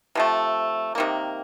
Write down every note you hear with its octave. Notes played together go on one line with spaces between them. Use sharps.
C3 F3 A3
C3 D#3 A#3